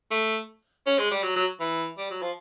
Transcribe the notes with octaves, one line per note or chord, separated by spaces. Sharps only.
A3
C#4
G#3
G3
F#3
F#3
E3
G3
F#3
F3